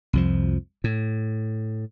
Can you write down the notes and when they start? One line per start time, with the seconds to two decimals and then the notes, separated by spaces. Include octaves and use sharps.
0.13 C2 F2 F3
0.84 A2